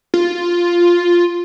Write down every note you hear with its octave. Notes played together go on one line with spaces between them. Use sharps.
F4